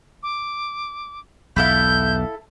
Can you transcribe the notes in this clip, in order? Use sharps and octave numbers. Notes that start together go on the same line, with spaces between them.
D6
B1 E2 E4 A4 F5 G6